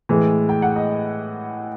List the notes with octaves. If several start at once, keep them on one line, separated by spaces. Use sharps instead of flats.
A2 E3 G#3
G5
F#5
D#5